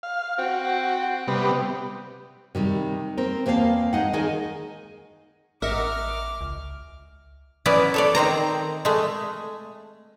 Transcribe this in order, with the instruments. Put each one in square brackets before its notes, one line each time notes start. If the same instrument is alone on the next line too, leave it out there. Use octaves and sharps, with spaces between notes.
[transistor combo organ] F5
[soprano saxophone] C4 [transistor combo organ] F#4
[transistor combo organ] C3 G3 B3
[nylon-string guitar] C3 D#3 G3
C4 A#4
E2 A#3 C4 C5 F5 A5
G#3 D#4 F#5
D#3 G#4 A#4 D#5 G#5
[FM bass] A1 [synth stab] A#4 D#5 F#5 [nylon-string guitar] E5 [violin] D6 F6
[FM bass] C#2
[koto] F#3 B3 C#4 E4 D5
A4 C#5 D5
D#3 C4 C5 A#5
G#3 A3